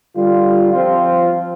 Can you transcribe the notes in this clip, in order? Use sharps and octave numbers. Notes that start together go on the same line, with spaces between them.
D3 G3 F4
F3 C4 F4